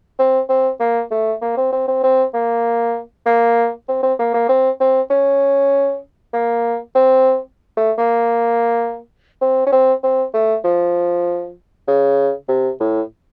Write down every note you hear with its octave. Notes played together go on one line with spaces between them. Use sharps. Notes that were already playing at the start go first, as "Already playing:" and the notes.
C4
C4
A#3
A3
A#3
C4
C4
C4
C4
A#3
A#3
C4
C4
A#3
A#3
C4
C4
C#4
A#3
C4
A3
A#3
C4
C#4
C4
C4
A3
F3
C#3
C3
A2